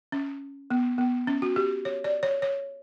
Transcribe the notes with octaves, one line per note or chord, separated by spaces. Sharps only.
C#4
B3
B3
C#4
F#4
G4
C#5
D5
C#5
C#5